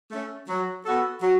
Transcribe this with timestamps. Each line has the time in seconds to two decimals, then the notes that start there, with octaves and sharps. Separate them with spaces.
0.11 A3 C#4
0.49 F#3
0.85 B3 F#4 A4
1.22 F#3